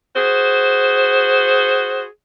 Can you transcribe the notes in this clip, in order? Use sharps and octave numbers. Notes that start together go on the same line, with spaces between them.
F#4 G#4 C5